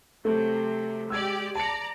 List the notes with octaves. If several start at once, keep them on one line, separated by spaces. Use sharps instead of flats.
C3 F#3 A3
G#3 G4 D5 E6 G#6
D5 A5 A#5 C#7